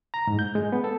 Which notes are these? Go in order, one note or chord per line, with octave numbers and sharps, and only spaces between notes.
A#5
G#2
G6
G#3
B3
A4